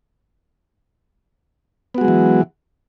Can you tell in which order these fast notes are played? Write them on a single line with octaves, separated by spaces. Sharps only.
B3 F#4 G#3 F#3 E3